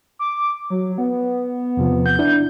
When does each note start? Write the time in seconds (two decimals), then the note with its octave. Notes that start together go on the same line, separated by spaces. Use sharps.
0.19 D6
0.70 F#3
0.98 B3
1.77 E2 C3 F3
2.06 G6
2.19 D4 E4